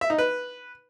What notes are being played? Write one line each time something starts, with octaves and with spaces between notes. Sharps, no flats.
E5
D#4
B4